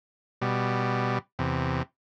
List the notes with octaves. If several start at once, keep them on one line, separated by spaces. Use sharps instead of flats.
B2 G3
E2 C3